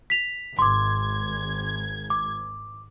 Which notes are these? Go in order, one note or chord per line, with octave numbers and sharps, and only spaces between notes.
B6 F7
G#1 C6 D6 G#6
D6